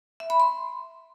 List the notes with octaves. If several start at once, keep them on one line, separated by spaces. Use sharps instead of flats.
E5
B5
C6